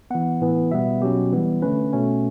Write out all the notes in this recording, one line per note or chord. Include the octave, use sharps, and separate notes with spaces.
E3 B3 F#5
A2 E3 B3
B2 G3 B3 E5
B2 F#3 C#4 G4
E3 G3 B3
D3 A3 C#4 B4
B2 A3 C#4